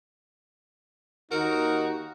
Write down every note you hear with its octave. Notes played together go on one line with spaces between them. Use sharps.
D#2 D#4 F#4 A#4